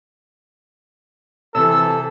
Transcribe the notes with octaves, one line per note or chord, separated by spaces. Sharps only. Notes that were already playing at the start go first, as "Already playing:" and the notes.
C3 E3 A4 E6